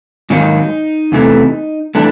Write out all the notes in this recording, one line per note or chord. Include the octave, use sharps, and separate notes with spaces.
G#2 D#3 F#3 A#3 D#4
E2 C3 E3 A3
E3 A3 D4